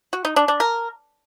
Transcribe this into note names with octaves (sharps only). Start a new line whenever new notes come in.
F#4
D#4
D4
D4
A#4